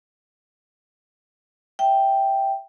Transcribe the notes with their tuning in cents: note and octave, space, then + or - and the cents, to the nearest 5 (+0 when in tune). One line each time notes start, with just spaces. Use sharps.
E5 +0 G5 +0